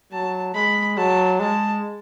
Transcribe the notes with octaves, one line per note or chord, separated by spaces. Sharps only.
F#3 A5
G#3 B5
F#3 A5
G#3 A5